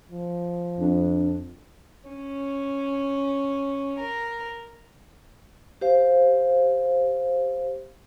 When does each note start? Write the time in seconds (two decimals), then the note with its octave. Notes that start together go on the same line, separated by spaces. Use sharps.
0.11 F3
0.79 F2 D4
2.10 C#4
4.00 A#4
5.81 G4 C5 F5